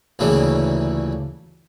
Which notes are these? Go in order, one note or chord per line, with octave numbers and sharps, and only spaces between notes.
D2 A#2 C#3 E3 G3